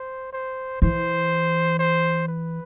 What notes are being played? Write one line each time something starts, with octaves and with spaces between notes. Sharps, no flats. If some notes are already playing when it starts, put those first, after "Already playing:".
Already playing: C5
C5
E3 C5
C5
B4